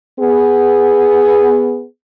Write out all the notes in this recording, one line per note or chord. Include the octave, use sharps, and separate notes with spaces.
B3 G#4